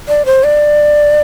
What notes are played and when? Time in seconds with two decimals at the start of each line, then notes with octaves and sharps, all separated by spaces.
0.08 D5
0.26 C5
0.44 D5